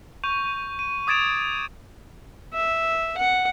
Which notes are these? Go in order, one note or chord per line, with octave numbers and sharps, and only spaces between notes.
C#6 G6 D#7 F7
D#7
D6 D#6 G#6 A6 D7 E7
E5
F#5